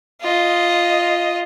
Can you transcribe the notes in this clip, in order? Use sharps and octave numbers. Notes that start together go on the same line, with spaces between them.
F4 D#5